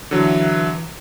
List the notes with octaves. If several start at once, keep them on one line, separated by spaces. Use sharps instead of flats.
D3 E3 F#3